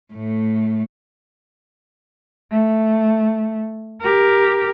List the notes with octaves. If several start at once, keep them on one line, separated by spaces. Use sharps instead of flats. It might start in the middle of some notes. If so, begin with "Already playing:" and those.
A2 A3
A3
G4 A#4